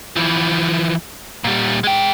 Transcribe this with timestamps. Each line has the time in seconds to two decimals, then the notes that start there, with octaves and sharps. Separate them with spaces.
0.16 E3 F3
1.44 A#2 G3
1.84 G#3 G5